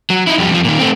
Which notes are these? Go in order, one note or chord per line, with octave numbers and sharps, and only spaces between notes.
F#3
D#4 E4
F2 G3
F2 F3
A#2 D#3
A3 C4